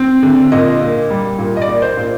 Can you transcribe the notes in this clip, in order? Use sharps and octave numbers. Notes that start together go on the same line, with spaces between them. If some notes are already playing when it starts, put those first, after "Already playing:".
Already playing: C4
D3
A#2 D#5
A#3
G3
A#2
D#5
D5
A#3
C5
A#2